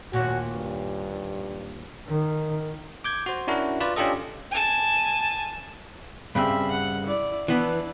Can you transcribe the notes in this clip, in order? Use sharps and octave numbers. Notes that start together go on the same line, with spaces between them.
D#2 A#2 F#4
G2
D#3
D6 G6 G#6
F#4 C5
C#4 D4 E4 F#4 A#4
F4 B4 D5
C#4 D4 F4 G4 A4 D#5
G#5 A5
G2 C#3 C4 E5 B5
F#5
E4 D5
E3 B3 D4 E4